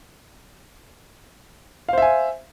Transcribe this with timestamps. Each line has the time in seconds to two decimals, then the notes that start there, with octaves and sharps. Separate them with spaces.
1.89 F5
1.93 C5
1.98 E5
2.02 G#5